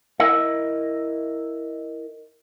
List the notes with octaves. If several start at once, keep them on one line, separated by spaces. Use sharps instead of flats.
E4 A#4 D#5 E5